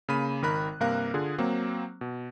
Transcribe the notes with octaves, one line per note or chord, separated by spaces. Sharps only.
C#3 A#3 B5 D#7
G#1 D#3 A#4 B5 F#6
G2 C3 A#3 A#4 F5 F#6
D3 F4 G#4
F#3 A#3 C4
B2